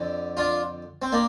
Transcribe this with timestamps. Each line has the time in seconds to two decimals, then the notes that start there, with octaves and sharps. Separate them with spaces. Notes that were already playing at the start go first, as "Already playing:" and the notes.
Already playing: F2 D3
0.37 D4 F4
1.02 C4
1.12 A#3 D4